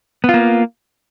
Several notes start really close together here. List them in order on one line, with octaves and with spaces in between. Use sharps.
B3 F4 A#3